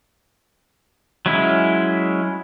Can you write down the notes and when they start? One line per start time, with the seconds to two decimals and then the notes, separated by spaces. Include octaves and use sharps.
1.26 F#3 G#3 C#4 E4